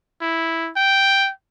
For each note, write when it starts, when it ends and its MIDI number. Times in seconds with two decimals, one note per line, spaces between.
0.21 0.70 64
0.76 1.30 79